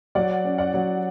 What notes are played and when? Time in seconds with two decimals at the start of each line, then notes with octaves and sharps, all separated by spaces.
0.15 F#3 D5 F#5
0.44 C#4
0.58 D5 F#5
0.74 F#3